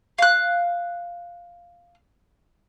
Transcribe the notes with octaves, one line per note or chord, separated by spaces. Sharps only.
F5 F#6